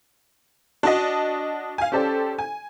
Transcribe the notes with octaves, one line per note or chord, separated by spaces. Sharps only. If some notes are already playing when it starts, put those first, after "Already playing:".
D4 F#4 D#5
F5 G#5
C#4 G4 A4 C5 D5
G#5